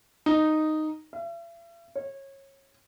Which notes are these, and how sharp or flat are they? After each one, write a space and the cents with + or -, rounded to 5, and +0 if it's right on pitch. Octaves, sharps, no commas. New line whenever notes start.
D#4 -5
E5 +45
C#5 -25